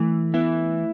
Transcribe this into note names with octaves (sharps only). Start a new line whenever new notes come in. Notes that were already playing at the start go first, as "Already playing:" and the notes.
Already playing: E3 A3
B3 E4